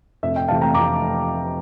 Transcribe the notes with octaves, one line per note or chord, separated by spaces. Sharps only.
F1 E5
E5 G5
F2 C3 E3 A3 F5 A5
G5 A#5
F1 A#5 D6